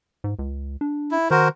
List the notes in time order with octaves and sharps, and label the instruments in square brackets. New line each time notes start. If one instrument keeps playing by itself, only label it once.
[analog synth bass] G#2
C#2
D4
[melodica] E4
[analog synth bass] D#3 [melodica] F#4 A#4 C5